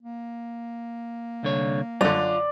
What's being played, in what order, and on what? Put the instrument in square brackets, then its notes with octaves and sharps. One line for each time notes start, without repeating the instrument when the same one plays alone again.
[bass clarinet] A#3
[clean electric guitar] C2 D3 C#5
[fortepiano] F#2 D3 [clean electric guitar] F4 [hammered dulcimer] D5